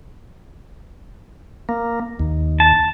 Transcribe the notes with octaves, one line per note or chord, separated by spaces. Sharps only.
A#3
D#2
A5